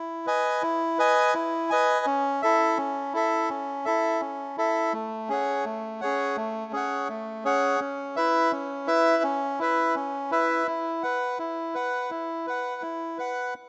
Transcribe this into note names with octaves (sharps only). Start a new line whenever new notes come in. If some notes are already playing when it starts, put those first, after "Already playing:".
Already playing: E4
B4 D#5 G#5
E4
B4 D#5 G#5
E4
B4 D#5 G#5
C#4
E4 A4 E5
C#4
E4 A4 E5
C#4
E4 A4 E5
C#4
E4 A4 E5
A3
C#4 G#4 C#5 F#5
A3
C#4 G#4 C#5 F#5
A3
C#4 G#4 C#5 F#5
A3
C#4 G#4 C#5 F#5
C#4
E4 B4 E5
C#4
E4 B4 E5
C#4
E4 B4 E5
C#4
E4 B4 E5
E4
B4 F#5
E4
B4 F#5
E4
B4 F#5
E4
B4 F#5